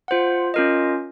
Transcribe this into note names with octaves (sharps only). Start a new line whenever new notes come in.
F4 C5 F#5
C#4 F4 A#4 D#5